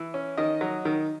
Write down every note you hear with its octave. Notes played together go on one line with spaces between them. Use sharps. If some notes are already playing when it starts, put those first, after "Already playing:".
Already playing: E3
C#4
D#3 D#5
F#3
D#3